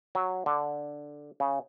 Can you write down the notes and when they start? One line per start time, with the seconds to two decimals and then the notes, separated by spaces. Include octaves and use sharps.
0.15 F#3
0.46 D3
1.40 C#3